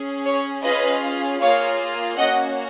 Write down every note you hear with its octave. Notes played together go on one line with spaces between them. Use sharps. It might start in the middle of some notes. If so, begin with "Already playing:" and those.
Already playing: C#4 G#4
C#5
C#4 F4 G#4 B4 D#5
A#3 F4 G#4 C#5 F5
A#3 C#4 F#4 D#5 F#5